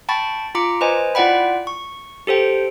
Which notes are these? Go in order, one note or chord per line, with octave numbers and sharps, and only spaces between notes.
G5 A5 B5 C#6 A6
F4 A#5 D6 C#7
B4 C5 D#5 G#5
E4 F4 D5 F#5 G5 B5
C#6
G4 A4 C5 G5